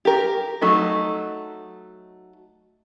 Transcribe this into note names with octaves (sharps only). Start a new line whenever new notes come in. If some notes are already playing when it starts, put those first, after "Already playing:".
G4 A#4
F#3 A3 D#4 F#4